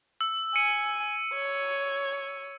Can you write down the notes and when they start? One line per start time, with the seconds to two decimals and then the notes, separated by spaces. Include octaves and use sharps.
0.21 E6
0.56 G#5 C#7 D#7
1.34 C#5